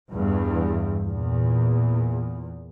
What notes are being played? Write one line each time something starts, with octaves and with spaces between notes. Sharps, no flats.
E2 G2
E2 A#2